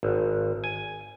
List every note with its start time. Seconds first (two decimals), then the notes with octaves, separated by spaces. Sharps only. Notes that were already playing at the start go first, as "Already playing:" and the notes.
0.03 G#1
0.64 G#5